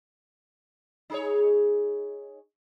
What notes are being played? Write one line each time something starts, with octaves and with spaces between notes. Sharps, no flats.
D#4 G#4 C#5